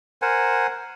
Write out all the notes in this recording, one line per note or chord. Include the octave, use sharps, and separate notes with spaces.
A#4 C5 F#5 G#5